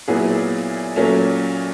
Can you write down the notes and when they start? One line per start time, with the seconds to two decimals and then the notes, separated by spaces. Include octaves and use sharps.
0.08 A#2 F#3 B3 E4 G#4
0.96 A#2 F#3 A3 C#4